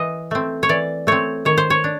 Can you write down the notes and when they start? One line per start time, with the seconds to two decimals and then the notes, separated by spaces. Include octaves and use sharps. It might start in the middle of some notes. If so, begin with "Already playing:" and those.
Already playing: E3 D#5
0.31 A3 C4
0.63 C#5
0.69 E3 D5
1.07 A3 C4 C#5
1.45 D#3 C#5
1.58 C5
1.70 C#5
1.84 D4